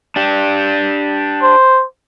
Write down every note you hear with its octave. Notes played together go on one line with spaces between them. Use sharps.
D4 G4
C5